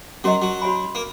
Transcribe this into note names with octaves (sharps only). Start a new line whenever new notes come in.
F#3 C#4 F#4 A#4 D#5 A#5
F#3
F#4 C#5 G#5 B5
A#3